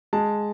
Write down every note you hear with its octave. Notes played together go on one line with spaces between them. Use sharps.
G#3 A5